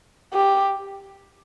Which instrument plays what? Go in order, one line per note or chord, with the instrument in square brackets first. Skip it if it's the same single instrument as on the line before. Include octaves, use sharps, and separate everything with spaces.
[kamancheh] G4